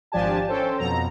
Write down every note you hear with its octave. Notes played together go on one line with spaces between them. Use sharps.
G#1 F3 D4 G4 G#5 A5
C#4 A4 C5 G5
F2 B2 A#5